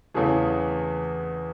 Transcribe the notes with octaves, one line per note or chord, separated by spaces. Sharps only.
E2 C#3 E3 A3 G#4